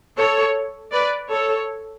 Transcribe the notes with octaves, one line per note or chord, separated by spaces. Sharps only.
A4 C#5
B4 D5
A4 C#5